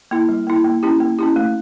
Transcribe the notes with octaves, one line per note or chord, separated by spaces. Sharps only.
A#3 E4
G3
A#3 E4
A#3
C#4 E4 G4
A#3
C#4 E4 G4
A3